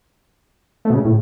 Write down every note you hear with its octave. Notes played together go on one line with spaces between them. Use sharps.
A3
B2
C#3
A2